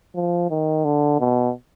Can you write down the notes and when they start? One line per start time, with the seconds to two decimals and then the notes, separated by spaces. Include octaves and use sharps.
0.15 F3
0.51 D#3
0.85 D3
1.20 B2